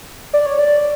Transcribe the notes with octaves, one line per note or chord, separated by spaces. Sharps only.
D5
C#5
D5